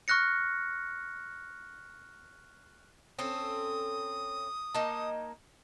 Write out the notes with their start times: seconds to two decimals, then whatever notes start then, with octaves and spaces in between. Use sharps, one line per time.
0.08 C#6 F6 F#6 A#6 C#7
3.19 C4 C#4 A4 D#6
4.74 A#3 D#4 A5